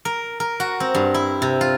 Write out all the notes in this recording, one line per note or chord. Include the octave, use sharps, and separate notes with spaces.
A#4
A#4
F#4
C4
G2
E4
C3
F4